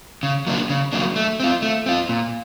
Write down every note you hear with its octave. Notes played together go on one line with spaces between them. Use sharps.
C#3
F#3 A#3 D4
C#3
F#3 A#3 D4
A3
C4 F4
A3
C4 F4
A#2